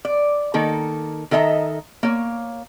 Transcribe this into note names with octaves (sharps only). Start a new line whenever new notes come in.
D5
D#3 A#3 A4
D#3 A4 D#5 E5 A#5
A#3 C#5